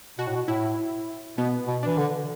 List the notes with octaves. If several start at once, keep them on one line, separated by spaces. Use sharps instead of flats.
B2 F#4
A2
B2
A2 E4
B2 B3
B2
E3 D4
D3